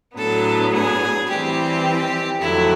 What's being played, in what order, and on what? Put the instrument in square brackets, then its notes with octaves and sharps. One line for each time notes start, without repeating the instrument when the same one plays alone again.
[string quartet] A2 F#3 B3 D4 [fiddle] A4
[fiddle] G#4
[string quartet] E3 G3 C4 [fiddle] G4
[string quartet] F2 D3 F#3 A3 [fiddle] E4